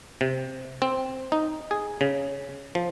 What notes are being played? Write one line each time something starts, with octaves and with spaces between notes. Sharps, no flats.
C3
C4
D#4
G#4
C#3
F3